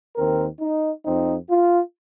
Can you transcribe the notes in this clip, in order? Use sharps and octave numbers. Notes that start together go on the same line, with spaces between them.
D#2 D#3 C4 A#4
D#4
F2 F3 C4 D#4
F4